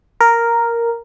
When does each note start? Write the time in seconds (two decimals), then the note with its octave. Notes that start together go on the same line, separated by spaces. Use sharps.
0.21 A#4